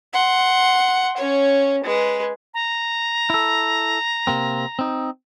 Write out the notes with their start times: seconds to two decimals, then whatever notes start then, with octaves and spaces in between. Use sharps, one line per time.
0.13 F#5 C6
1.17 C#4 C#5
1.84 G#3 B4
2.54 A#5
3.30 E4 A4
4.27 C3 A#3 C4
4.79 C4 D#4